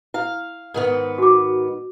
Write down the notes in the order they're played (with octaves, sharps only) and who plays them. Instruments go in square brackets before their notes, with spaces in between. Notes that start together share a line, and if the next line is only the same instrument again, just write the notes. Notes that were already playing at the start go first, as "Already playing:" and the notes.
[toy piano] E4 [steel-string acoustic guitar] F5
[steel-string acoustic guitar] G#2 D#3 B3
[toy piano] F#4 D6